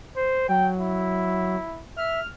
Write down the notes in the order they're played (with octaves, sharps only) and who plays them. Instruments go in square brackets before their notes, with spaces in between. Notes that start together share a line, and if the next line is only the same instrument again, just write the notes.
[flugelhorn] C5
[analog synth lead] F#3 [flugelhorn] G5
[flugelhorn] E4
[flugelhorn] E5 [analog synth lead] F6